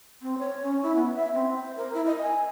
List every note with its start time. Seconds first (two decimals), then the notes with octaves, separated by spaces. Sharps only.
0.22 C4
0.38 C#5
0.63 C#4
0.83 E4
0.95 B3
1.15 E5
1.34 C4
1.55 C5
1.76 A#4
1.94 E4
2.06 D#5
2.21 G#5